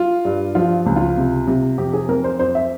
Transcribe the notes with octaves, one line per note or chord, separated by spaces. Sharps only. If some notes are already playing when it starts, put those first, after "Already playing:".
Already playing: F4
G2
F3 F4
C#2
F4
C3
C3
F2 G4
G#4
F2 A#4
C5
F2 C5
E5